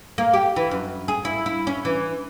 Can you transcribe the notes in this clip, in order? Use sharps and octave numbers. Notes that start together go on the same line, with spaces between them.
A#3
G4
E3
F#2
G#4
E4
E4
C#4
E3